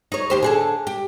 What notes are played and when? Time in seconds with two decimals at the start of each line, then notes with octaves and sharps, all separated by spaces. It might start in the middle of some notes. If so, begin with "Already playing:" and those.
0.12 D#4 C#5
0.30 D#2 G4 C5
0.43 D3 G#4 A4
0.87 G4